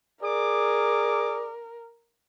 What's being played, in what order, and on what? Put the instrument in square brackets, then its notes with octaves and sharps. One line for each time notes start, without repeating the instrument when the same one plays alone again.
[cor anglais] G#4 [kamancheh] A#4 [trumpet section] D5 D6